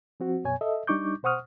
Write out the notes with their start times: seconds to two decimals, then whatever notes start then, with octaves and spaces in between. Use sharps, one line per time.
0.20 F3 C4 F#4
0.44 F#2 B2 C#5 G#5
0.61 A4 D#5 E5
0.87 G3 D4 D#4 C#6 D6 G6
1.23 B2 C5 F#5 C#6 D#6 F6